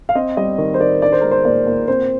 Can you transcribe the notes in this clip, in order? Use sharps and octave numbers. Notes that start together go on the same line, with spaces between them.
F5
C4 D#5
G3 D#5
D#3
C5
D#3 D5
D4 D5
C5
G#3 A#4
C5
A#2 D5
A#2
C4 C5